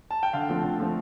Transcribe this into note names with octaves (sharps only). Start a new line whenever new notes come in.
A5
G5
D3 F5
F3 A3 C4
D3
F3 A3 C4